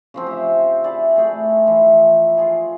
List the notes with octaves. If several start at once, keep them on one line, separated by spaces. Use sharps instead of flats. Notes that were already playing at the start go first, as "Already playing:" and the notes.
C#3 F3 C4
G4 E5
E4 G#4 D5
A3 G#4 G5
E3 F3
F4 G#4